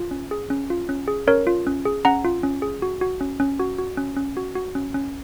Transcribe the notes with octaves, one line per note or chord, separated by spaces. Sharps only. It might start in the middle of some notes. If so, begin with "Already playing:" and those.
Already playing: F4
C#4
G#4
C#4
F4
C#4
G#4
C#4 A#4 C#5
F4
C#4
G#4
C#4 F#5 A#5
F4
C#4
G#4
F#4
F#4
C#4
C#4
F#4
F#4
C#4
C#4
F#4
F#4
C#4
C#4